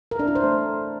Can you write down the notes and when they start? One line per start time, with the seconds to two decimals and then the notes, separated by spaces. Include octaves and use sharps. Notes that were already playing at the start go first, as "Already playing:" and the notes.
0.11 A#4
0.19 D4
0.27 E4
0.35 C5
0.44 A3